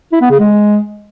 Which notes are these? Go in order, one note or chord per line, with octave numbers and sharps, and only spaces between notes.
E4
B3
C#3
G#3